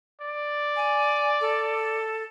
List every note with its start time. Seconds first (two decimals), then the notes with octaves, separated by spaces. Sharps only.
0.21 D5
0.76 G#5
1.41 A4